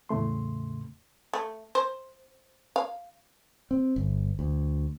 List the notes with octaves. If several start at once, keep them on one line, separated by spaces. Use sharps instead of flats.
E2 A2 C#3 A3 C6
A3
C5
F5
C4
G1
D2